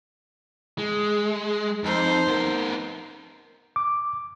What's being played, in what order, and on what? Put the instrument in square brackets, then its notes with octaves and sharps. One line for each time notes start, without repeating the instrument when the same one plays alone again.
[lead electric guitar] G#3
[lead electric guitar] F2 [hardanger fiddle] D#4 C5
[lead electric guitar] B3 A#4
[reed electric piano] D6